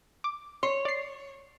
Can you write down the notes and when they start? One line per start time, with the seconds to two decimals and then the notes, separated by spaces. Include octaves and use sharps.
0.24 D6
0.63 C#5 C6
0.85 D5 C7